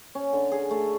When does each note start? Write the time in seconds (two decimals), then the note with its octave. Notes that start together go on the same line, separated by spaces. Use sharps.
0.15 C#4
0.33 D3
0.52 G#4
0.71 A3